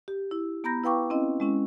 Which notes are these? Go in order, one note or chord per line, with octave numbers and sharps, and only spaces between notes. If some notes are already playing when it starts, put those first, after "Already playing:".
G4
E4
B3 A#5 B5 G6 A#6
E4 B4 F5 G5 C#6 D6
C4 C#4 E4 D#5
G#3 C#4 E4